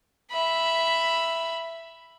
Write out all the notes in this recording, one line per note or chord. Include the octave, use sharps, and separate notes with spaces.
E5 B5